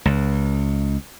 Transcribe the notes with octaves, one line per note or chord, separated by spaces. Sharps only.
C#2